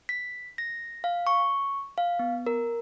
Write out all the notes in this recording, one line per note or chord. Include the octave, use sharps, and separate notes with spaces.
B6
A#6
F5
C#6
F5
B3
A#4